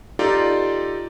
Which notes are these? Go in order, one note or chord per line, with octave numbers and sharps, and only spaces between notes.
D#4 F4 G4 A4 D5